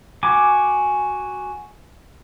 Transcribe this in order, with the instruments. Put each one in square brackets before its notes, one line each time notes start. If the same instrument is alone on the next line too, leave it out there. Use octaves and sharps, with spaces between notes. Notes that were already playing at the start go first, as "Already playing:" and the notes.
[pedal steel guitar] F#4 G#5 D6